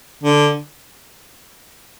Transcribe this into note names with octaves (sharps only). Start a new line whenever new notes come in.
D3